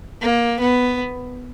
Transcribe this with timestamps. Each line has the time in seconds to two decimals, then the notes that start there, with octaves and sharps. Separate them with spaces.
0.21 A#3
0.60 B3